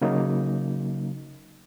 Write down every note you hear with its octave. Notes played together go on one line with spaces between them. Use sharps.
C#3 F#3 A#3 D#4